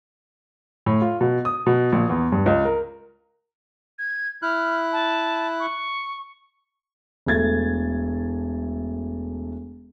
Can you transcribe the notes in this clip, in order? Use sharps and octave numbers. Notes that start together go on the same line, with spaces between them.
A2
F4
B2
D#6
B2
A#1
E2
G2
C#2
A#4
G#6
E4 F6 F#6
A5
C#6
E1 A3 G#6 A6